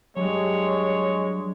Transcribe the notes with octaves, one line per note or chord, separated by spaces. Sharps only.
G2 F#3 G#3 C#5